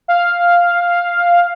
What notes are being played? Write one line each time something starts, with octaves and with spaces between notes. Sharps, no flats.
F5